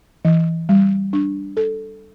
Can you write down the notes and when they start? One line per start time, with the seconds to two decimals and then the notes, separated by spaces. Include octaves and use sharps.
0.25 E3
0.69 G3
1.13 D4
1.57 A4